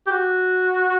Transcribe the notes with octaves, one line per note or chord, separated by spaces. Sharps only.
G4
F#4